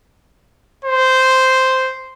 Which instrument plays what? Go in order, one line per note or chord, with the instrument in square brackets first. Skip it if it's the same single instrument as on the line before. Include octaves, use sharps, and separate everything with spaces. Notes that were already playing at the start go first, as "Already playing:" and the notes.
[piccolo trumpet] C5